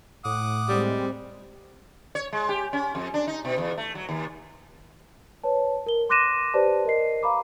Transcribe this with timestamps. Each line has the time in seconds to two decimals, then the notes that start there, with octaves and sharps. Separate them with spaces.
0.25 A2 F#5 D6 D#6
0.69 G3 G#3 C4
2.15 C#5
2.33 G#3
2.49 G4
2.73 C#4
2.95 F2
3.14 D4
3.27 D#4
3.45 B2
3.58 E2
3.77 A3
3.95 F#3
4.09 D#2
5.44 B4 C#5 A5
5.87 A#4 G7
6.09 C6 D6 F#6 A#6 D#7 E7
6.54 G4 B4 C5 D5 A5
6.85 A#4 D#5 C7
7.23 F5 A#5 B5 D6